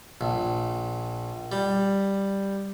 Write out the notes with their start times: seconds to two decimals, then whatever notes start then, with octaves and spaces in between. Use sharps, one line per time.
0.21 A#1
1.52 G3